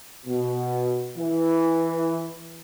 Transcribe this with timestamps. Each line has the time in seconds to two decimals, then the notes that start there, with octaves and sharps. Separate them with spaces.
0.26 B2
1.17 E3